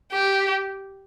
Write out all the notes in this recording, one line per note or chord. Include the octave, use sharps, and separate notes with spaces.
G4